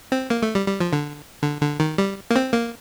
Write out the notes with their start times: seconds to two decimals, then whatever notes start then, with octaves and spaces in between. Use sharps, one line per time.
0.12 C4
0.30 A#3
0.42 A3
0.55 G3
0.67 G3
0.80 F3
0.93 D3
1.42 D3
1.61 D3
1.80 D#3
1.98 G3
2.31 A#3
2.36 C4
2.54 A#3